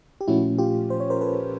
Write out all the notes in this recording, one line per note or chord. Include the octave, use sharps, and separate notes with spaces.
G4
A#2 F3 A3 C#4 E4 F#4
F4 G4
C5
C#5
A#4 C5
A4 B4